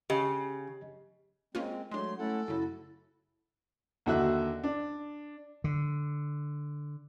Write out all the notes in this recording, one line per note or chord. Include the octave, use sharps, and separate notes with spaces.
C#3 G4 D#5
G#3 A#3 C4 C#4 F4
F#3 G#3 A3 D4 C6
A3 C#4 E4 A4 F#5
F#2 C#3 E4 F#4
D#2 D3 F#4 E5 E6 F#6
D4
D3